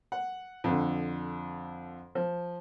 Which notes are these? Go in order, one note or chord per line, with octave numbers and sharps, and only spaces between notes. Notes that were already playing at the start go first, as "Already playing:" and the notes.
F#5
F2 D3
F3